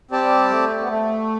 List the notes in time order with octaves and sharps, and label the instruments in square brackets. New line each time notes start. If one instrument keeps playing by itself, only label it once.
[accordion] G3 [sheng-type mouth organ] C4 G4 D5 A5
[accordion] A3
B3
A3